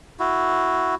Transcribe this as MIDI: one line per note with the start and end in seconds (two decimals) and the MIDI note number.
0.19 0.95 64
0.19 0.95 66